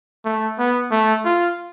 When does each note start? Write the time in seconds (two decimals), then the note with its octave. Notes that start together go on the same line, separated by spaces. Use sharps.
0.25 A3
0.59 B3
0.91 A3
1.25 F4